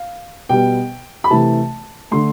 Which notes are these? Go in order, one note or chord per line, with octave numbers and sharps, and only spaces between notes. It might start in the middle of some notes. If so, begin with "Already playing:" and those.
Already playing: F5
B2 G3 B3 G5
B5
C3 E3 A3 A5
D3 A3 C6